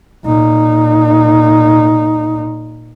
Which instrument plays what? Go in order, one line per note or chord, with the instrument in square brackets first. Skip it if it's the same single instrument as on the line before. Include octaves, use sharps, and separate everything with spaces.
[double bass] A#2 D#4